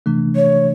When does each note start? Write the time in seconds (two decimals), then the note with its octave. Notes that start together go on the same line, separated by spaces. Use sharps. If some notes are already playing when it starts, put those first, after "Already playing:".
0.06 C3 E3 A3 D4
0.36 C#5